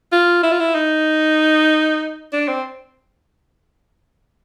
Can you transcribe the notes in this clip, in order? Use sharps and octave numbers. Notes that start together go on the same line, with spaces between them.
F4
E4
F4
E4
D#4
D4
C4